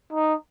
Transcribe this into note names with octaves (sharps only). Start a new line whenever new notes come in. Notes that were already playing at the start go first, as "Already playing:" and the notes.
D#4